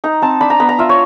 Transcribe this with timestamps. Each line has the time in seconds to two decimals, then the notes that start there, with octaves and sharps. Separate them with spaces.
0.04 D#4 A#5
0.22 C4 A5
0.41 D4 B5
0.50 A#5
0.60 B3 B5
0.69 A#5
0.79 F4 E5
0.89 C#5